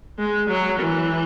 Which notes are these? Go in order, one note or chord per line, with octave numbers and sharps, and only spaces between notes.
G#3
F#3
E3